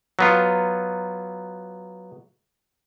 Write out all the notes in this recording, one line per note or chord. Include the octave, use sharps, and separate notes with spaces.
F#3 B3 F4